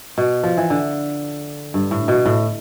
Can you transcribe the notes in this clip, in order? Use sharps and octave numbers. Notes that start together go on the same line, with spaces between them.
B2
F3
E3
D3
G2
A2
B2
A2